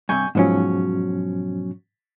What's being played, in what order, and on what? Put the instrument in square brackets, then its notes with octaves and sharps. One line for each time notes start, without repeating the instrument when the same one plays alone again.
[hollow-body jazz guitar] G2 C3 [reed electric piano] G#5 C#6 G6
[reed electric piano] G#2 F3 C#4 [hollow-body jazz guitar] B2 F#3